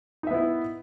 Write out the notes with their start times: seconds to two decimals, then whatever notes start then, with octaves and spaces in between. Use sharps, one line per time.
0.23 D#4
0.27 E5
0.31 B3
0.34 E4